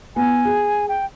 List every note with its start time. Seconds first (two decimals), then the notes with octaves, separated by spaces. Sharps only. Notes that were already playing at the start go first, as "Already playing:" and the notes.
0.16 B3 G#5
0.45 G#4
0.89 G5